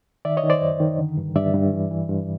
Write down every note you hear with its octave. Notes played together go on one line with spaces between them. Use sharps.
D#3 D5 E5
C#5 D#5
D#3
C5 D5
F#2
D#3
D3
G2
G2 D5 E5
G2
E3
E3
G2